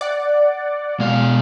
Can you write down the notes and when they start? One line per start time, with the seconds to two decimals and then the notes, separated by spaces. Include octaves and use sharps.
0.01 D5 F#5
1.00 B2 G#3 F5